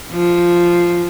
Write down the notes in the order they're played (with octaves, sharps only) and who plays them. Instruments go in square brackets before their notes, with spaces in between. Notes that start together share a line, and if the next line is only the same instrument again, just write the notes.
[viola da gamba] F3